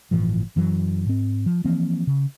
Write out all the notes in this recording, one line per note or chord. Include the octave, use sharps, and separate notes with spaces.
G1 A2 E3 F3
F#2 E3 F#3
G#2 C4
F3
E3 F3 A#3 C4
C#3